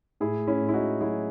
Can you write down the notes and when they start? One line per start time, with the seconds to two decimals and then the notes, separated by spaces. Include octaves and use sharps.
0.20 A2 E4 G#4
0.47 C#4 E4
0.62 A2
0.68 E4
0.74 D#4 F#4
1.00 F#3 E4 G#4